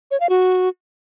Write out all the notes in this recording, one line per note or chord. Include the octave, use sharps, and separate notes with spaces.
C#5
F5
F#4